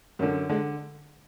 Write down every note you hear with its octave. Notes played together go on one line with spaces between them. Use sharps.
F#2 D3
D3 G#3